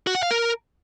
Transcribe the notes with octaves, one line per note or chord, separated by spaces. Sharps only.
F#4
F#5
F5
A#4